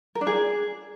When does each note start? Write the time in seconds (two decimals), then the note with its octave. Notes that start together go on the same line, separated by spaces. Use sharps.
0.15 A#4
0.21 D4
0.27 G#4